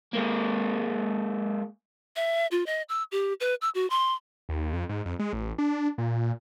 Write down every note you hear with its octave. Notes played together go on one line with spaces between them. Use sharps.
G#3 A#3
E5
F4
D#5
E6
G4
B4
E6
F#4
C6
D#2
F2
G#2
F2
G#3
A1
D4
A#2